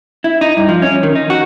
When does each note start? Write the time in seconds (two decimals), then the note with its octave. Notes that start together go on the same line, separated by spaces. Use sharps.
0.24 E4
0.41 D#4
0.57 G2
0.69 F3
0.82 C#4
1.03 D#3
1.15 D#4
1.30 F#4